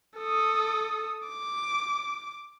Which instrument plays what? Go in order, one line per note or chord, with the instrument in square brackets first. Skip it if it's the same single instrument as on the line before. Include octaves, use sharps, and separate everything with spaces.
[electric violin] A4 D#6
D6